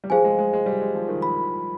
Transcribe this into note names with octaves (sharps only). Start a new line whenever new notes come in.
G3
F3 G#4 C5 F5 G#5
G#3
G#3
G#3
G3
G#3
F3
D#3
B5